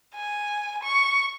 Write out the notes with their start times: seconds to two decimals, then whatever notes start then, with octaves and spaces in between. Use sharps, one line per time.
0.15 G#5
0.83 C#6